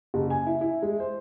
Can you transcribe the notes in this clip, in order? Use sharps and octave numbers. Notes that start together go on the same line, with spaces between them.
F#1
G#5
E4
E4
G#3
C5